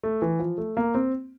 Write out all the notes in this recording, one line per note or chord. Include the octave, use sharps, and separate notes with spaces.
A3
E3
F3
A3
A#3
C4